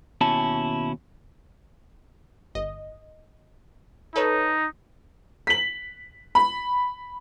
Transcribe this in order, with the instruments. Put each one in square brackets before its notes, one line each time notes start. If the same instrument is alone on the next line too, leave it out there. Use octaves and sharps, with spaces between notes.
[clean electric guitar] D#2 B2 C#4 E4 A5
[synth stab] G1 D#5
[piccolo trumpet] D#4 [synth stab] A4 B4 C#5
[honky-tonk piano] B6 F#7
B5